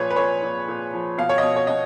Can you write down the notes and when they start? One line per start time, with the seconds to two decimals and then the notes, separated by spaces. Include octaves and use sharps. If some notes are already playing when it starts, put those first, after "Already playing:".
Already playing: A#2 F3 G#4 B4 C#5
0.11 B4
0.16 A#2 C#5
0.43 A#2
0.68 A#2
0.93 F3
1.18 B2 F5
1.29 C#5
1.38 D#5
1.43 B2
1.56 C#5
1.67 B2 D#5